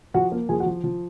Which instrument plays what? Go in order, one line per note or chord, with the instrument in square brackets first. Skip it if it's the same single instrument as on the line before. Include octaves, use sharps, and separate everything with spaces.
[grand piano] F3 [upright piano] F#4 F#5
[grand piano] A#3
[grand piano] F3 [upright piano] G#4 G#5
[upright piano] F#4 F#5
[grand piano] F3
F3